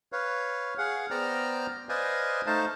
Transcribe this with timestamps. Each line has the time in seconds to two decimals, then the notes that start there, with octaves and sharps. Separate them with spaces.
0.12 B4 C#5 F5
0.78 G#4 F5 F#5
1.11 B3 C5 D5 G5 A#5 F6
1.89 B4 C5 D5 D#5 F5 G#5
2.47 A3 D#4 C5 F5 A5